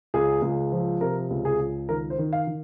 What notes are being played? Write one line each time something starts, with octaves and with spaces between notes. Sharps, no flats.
C#2 G#4
C#2
F3
C3 A#4
C#2
G#4
C#2
D#3 A#4
C5
D#3
F5
D#3